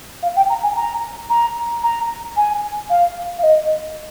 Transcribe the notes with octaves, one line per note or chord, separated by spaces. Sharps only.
F5
G5
A#5
G#5
A#5
A#5
A#5
G#5
F5
F5
D#5